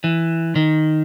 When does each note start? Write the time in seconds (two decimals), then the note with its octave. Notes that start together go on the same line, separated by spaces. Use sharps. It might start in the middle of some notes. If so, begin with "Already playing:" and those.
0.04 E3
0.56 D#3